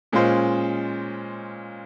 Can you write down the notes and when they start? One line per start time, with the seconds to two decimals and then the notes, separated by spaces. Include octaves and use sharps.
0.12 A#2 G#3 C#4 F4 C5